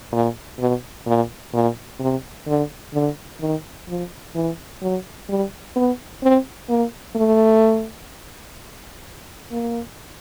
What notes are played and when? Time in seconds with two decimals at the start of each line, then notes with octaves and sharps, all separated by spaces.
0.13 A#2
0.59 B2
1.07 A#2
1.54 A#2
2.00 C3
2.47 D3
2.94 D3
3.40 D#3
3.89 F3
4.35 E3
4.82 F#3
5.29 G3
5.76 B3
6.23 C4
6.70 A#3
7.16 A3
9.52 A#3